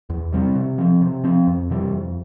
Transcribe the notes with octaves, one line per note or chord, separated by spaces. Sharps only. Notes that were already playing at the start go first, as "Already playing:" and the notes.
E2
C3 G3 C4
C3
F3 C4
C3
F3 C4
F2
C3 E3 G3
F2